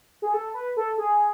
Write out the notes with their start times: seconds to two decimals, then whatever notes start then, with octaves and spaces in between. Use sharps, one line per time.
0.22 G#4
0.34 A4
0.54 B4
0.77 A4
0.98 G#4